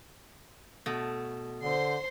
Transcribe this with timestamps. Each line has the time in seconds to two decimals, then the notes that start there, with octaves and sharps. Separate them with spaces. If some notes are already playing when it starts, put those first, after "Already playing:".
0.86 B2 A3
1.62 D3 C5 C6